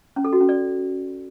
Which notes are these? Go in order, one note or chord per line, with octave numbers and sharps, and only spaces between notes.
C#4
A4
F#4
C#4
D5